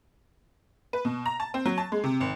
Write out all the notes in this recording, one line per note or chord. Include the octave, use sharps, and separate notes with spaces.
B4
B2
A#5
A5
C4
F#3
A5
G#3
C3
G#1